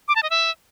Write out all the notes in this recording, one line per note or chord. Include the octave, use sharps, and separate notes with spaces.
D6
A5
D#5
E5